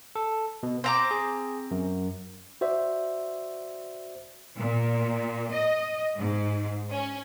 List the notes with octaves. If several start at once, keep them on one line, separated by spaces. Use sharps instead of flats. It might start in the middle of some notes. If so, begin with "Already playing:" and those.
A4
B2
C4 C5 A#5 D6
G#4
F#2
F#4 C5 D5 E5
A#2
D#5
G#2
C#4